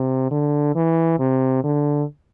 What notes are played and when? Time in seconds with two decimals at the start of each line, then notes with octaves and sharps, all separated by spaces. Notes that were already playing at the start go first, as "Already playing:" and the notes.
Already playing: C3
0.31 D3
0.75 E3
1.19 C3
1.64 D3